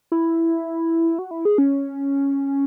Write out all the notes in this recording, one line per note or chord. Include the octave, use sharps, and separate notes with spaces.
E4
F#4
E4
G#4
C#4